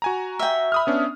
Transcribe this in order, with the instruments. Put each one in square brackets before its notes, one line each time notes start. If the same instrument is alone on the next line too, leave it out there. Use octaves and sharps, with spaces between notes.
[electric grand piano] F#4 G#5 A#5
[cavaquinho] E5 G5
[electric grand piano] B5 D#6 F6
B3 C#4 D4